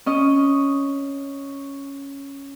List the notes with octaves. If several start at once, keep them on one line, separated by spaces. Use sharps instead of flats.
C#4 D#5